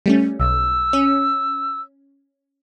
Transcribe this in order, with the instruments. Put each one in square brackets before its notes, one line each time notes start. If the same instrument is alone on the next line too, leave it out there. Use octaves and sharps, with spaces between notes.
[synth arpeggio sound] G3 A3 C#4
[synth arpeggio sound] B1 [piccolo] E6
[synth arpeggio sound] C#4